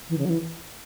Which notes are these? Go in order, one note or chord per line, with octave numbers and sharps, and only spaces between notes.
E3
C#3
F#3
E3